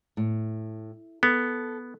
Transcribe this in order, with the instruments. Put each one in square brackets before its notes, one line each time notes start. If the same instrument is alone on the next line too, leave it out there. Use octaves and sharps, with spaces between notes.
[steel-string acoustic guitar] A2
[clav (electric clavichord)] B3 [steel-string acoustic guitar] A4